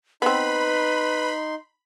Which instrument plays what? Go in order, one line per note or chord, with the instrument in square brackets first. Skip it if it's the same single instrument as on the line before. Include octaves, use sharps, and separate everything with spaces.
[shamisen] B3 C4 [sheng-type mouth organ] D#4 C6 [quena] B4 [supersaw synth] B5